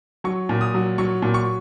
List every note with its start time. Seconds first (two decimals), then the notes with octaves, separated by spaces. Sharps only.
0.24 F#3 C#6
0.49 A#2
0.61 D#6
0.74 F#3
0.98 F#3 C#6
1.22 A#2
1.34 C#6